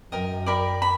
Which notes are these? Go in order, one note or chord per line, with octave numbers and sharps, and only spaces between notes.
F#2 A#4 D#5 G5
A#4 D5 G5 B5
B5